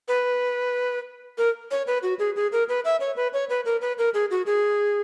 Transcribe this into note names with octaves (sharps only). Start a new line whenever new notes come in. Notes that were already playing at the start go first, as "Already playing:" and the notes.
B4
A#4
C#5
B4
F#4
G#4
G#4
A#4
B4
E5
C#5
B4
C#5
B4
A#4
B4
A#4
G#4
F#4
G#4